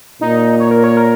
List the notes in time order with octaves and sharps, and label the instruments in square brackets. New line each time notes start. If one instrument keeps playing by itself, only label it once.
[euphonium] A#2 [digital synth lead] D#4
[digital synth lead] C#5
A#4
C#5
A#4